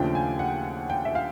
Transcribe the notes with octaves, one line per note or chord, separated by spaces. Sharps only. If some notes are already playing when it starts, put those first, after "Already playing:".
Already playing: D#2 C#3 F3 A3 D4 G5
G#5
F#5
G5
E5
F5